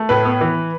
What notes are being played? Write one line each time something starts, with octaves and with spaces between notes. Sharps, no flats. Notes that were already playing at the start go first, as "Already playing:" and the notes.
Already playing: A3
A2 B4
B3
E3